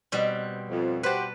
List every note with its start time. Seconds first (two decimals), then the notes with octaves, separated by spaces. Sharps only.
0.12 B2 G3 C4
0.69 F2
1.03 F#4 G4 B4 C5 A5